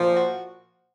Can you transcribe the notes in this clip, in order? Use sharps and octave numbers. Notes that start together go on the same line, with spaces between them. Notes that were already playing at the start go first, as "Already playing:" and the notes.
Already playing: A#2 F3
F#4